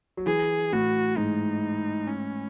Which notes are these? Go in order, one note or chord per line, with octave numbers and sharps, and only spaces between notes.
F#3
E3 G#4
A2 F#4
G#2 D#4
C#4